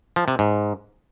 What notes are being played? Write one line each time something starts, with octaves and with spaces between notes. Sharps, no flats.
F3
C3
G#2